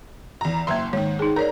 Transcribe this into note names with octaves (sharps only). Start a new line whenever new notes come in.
E2 A#5
F#1 A#3 E5 A#5 C6
G#2 D#3 C#5
D#4 G#4
A#4 C#5 D5 A#5